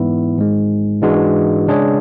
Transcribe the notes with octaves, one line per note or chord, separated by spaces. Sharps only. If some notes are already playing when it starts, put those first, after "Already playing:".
Already playing: G#2 E3 B3 E4
G#1 G#2 G#3
G#2 E3 G#3 D4 F#4
C#3 G#3 D4 G#4 C#5